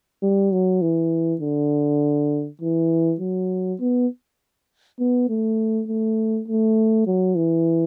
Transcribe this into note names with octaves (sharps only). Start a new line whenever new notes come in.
G3
F#3
E3
D3
E3
F#3
B3
B3
A3
A3
A3
F#3
E3